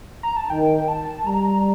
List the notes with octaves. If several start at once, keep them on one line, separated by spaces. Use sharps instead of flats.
A#5
A5
D#3 G5
A5
G3 A#5